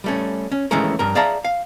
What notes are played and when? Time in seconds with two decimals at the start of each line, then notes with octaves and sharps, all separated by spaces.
0.04 G3 A3 C#4
0.52 C#4
0.71 D#3 E3 G#3 A3 C#4 A#4
0.99 G2 A#4
1.15 G#4 D5 E5 F5 A5 A#5
1.45 F5